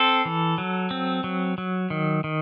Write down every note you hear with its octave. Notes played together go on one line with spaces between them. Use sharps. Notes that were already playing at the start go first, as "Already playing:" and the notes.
Already playing: C4 A4
E3
F#3
C4
F#3
F#3
D#3
D#3